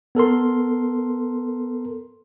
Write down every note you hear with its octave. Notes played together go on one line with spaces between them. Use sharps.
B3 A4 A#4 C6